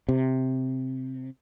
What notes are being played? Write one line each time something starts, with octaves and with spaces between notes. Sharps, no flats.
C3